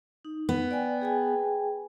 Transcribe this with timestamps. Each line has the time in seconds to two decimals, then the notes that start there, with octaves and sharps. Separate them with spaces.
0.25 D#4
0.49 B3
0.71 D5 G5 G#5
1.02 G#4 G5 G#5